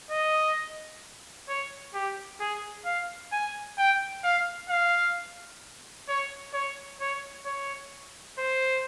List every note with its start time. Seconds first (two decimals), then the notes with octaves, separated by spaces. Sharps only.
0.11 D#5
1.49 C#5
1.94 G4
2.40 G#4
2.86 F5
3.32 G#5
3.78 G5
4.24 F5
4.70 F5
6.09 C#5
6.54 C#5
7.01 C#5
7.46 C#5
8.38 C5